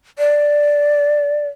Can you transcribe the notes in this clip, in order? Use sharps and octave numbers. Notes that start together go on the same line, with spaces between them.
D5